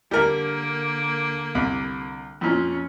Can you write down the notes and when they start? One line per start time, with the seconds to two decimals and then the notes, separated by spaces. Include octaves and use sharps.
0.11 D3 G3 A#3 A#4
1.55 C2
2.41 F2 A#2 C#4